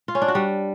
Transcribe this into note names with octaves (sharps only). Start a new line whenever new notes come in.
F4
C#4
D4
F#4
G3